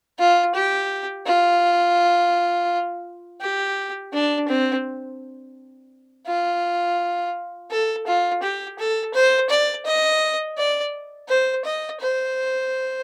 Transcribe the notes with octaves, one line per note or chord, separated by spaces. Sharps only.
F4
G4
F4
G4
D4
C4
F4
A4
F4
G4
A4
C5
D5
D#5
D5
C5
D#5
C5